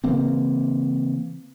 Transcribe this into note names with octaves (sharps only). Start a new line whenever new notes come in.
C#3 E3 A#3 C4